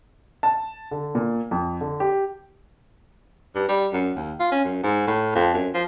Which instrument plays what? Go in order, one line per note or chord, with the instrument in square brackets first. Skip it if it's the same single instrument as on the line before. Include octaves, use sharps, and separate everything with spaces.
[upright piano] A5
D3
A#2
F2
D3
G4
[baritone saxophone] G2
G3
F#2
D#2
F4
C#4
F#2
G#2
A2
F2
F#2
F3